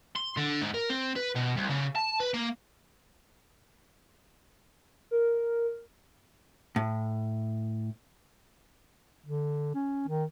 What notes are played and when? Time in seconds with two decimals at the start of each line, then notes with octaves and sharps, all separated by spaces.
0.15 C6
0.37 D3
0.62 G#2
0.75 A#4
0.90 C4
1.16 B4
1.35 B2
1.56 C2
1.69 C#3
1.96 A5
2.20 B4
2.34 A#3
5.11 A#4
6.76 A2
9.26 D3
9.74 C#4
10.08 D#3